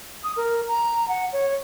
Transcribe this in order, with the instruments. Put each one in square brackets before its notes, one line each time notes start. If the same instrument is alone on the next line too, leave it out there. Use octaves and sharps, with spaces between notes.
[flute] D#6
A#4
A#5
F#5
C#5